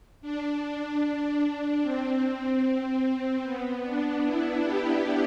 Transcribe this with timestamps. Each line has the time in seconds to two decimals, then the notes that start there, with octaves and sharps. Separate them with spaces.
0.22 D4
1.83 C4
3.43 B3
3.84 D4
4.24 E4
4.64 G4